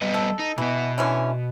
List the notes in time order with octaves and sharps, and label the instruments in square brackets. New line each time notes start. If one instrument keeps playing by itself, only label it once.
[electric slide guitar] G3 B3 D#5
[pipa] A4
[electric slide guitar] D#4
[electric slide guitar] B2 B3 [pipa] E3
[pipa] D3 E3 C#4